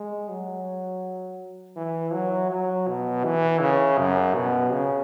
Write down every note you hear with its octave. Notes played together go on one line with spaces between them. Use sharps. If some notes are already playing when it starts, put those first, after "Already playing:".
Already playing: G#3
F#3
E3
F#3
F#3
B2
E3
C#3
F#2
B2
C#3